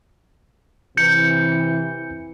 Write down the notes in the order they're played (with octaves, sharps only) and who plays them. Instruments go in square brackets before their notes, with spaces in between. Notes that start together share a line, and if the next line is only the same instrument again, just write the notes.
[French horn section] C3 E3 [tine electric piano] G6 C#7